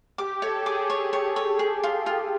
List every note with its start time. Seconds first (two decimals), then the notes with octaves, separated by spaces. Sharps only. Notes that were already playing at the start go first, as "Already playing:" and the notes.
0.18 G4 D6
0.42 A4 C#5
0.65 G#4 D6
0.90 C#5
1.13 C#5
1.36 C#5
1.59 G#4
1.83 F4
2.06 F4